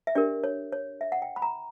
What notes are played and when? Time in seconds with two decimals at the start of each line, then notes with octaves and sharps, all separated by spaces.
0.07 E5
0.15 D4 G4 A#4 D5
0.44 C#5
0.72 C#5
1.01 E5
1.12 F#5
1.22 G5
1.36 B5
1.42 A#5